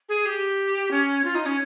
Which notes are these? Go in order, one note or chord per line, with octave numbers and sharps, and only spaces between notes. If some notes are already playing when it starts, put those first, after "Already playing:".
G#4
G4
C#4
F4
D#4
C#4